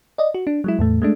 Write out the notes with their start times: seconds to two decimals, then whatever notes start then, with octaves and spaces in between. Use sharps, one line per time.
0.18 D5 D#5
0.34 F#4
0.47 D4
0.64 F#3 G#3 E4
0.79 E2 A2 A3
1.02 G#3 A3 D4